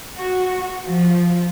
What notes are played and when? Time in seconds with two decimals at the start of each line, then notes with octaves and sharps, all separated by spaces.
0.17 F#4
0.86 F3